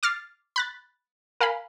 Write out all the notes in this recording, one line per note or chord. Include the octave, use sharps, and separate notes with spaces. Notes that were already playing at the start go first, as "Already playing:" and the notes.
D6 F6 A6 C7
B5 F#6 A6
A#4 F5 G#5 B5